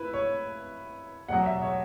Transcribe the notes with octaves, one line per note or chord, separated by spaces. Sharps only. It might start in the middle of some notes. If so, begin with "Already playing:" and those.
Already playing: E4 B4
C#5
E2 B2 F#3 F#5
E5
C#5